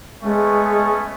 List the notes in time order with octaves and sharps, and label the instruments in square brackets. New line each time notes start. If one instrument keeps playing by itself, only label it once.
[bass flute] G#3 [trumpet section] A3 B3 C#4